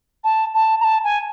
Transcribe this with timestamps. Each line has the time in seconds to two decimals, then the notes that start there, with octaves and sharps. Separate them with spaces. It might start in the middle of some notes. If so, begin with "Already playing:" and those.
0.24 A5
0.54 A5
0.81 A#5
0.84 A5
1.04 G#5